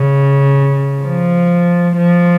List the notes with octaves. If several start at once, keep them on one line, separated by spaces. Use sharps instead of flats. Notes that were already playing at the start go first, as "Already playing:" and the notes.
Already playing: C#3
F3
F3